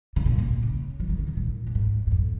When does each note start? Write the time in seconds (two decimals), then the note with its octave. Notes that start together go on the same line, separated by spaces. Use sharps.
0.16 C#3
0.26 A#2
0.38 A#2
0.63 C#3
1.00 F3
1.09 D#3
1.19 C#3
1.28 D#3
1.37 A#2
1.67 F2
1.75 G#2
2.07 G#2
2.11 F2